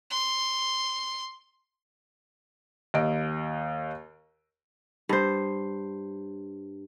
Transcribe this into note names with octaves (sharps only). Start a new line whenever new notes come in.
C6
D#2 D#5 D7
G2 C5